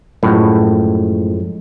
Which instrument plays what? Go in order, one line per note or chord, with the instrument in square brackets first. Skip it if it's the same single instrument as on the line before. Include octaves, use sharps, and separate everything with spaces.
[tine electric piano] F#2 F3 G#3 [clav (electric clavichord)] A2